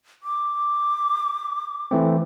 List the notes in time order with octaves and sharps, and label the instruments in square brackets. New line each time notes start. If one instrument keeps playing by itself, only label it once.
[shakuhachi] D6
[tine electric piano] E3 A3 C4